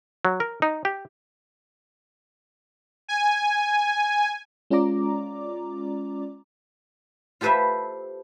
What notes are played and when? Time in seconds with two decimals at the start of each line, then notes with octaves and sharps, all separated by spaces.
0.25 F#3
0.40 A#4
0.62 D#4
0.85 G4
3.08 G#5
4.70 G#3 C#4 F4 D5 A#5 D6
7.41 F4 G4 A4 B4 C5 E5